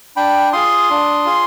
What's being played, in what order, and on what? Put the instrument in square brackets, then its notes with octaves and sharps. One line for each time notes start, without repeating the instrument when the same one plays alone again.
[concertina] D4 G5 B5
F4 G#4 C6 D#6
D4
F4 G#4